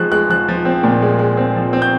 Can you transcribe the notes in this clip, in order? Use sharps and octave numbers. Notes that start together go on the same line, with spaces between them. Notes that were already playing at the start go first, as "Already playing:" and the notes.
Already playing: F3 G#3 F#6
G#3 F#6
F3 F#6
F3
C4
A#2
G#3
G#3
C4
F3
C4
G6